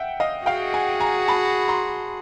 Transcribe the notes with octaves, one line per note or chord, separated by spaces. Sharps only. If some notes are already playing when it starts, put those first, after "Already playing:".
Already playing: E5 F#5 G5
D#5 F5
F#4 G#4 F5 G5
F#5 G#5
G#5 A#5
A5 B5
A#5 C6